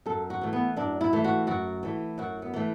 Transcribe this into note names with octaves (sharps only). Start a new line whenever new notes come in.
F#2 A4
F#4
E3 A3
B3
F#2 D4
E4
E3 A3
F#4
F#2 F#4
E3 A3
F#2 F#4
B3
E3 A3